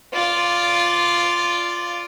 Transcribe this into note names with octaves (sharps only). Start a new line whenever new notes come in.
F4 D5